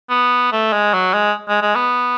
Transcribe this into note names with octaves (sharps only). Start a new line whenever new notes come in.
B3
A3
G#3
F#3
G#3
G#3
G#3
B3